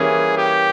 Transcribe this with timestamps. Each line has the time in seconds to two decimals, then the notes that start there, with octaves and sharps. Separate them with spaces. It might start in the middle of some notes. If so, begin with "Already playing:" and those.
Already playing: E3 G3 A#3 C#4 G#4
0.37 G4